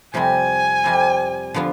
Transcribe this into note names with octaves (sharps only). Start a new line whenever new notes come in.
F2 C3 G3 C4 G#5
F2 C3 G3 C4
D3 F3 B3 F4